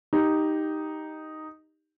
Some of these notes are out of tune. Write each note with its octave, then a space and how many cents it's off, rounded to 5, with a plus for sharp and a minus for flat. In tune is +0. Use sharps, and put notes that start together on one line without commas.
D#4 +0 G4 +0